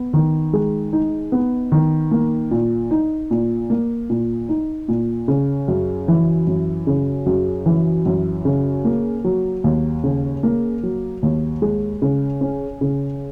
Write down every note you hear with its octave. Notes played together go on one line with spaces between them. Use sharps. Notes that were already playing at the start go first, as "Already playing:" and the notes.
Already playing: B3
D#3
G#3
D#4
B3
D#3
A#3
A#2
D#4
A#2
A#3
A#2
D#4
A#2
C#3
F#2
E3
F#2
C#3
F#2
E3
F#2
C#3
A#3
F#3
D#2
C#3
A#3
F#3
D#2
G#3
C#3
C#4
C#3